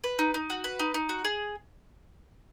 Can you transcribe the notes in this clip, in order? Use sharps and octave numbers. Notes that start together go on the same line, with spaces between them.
B4
D#4
D#4
F#4
B4
D#4
D#4
F#4
G#4